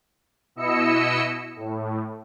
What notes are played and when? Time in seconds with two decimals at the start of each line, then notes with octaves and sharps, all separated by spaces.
0.56 B2 E4 D#5 E6 C#7
1.56 A2